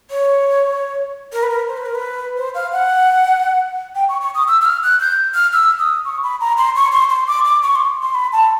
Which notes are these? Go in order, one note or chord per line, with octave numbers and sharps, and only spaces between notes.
C#5
A#4
B4
A#4
C5
B4
A#4
B4
C5
F5
F#5
G5
C#6
C#6
D#6
E6
E6
F6
F#6
G6
F6
E6
D#6
C#6
B5
A#5
C6
C#6
C6
C6
D6
D6
C#6
C6
C6
B5
A5